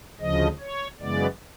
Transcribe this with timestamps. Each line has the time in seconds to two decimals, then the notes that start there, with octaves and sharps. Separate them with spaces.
0.20 D2 C#3 F3 D#5
0.60 C#5
0.99 F#2 C#3 E3 G#3 B3 D5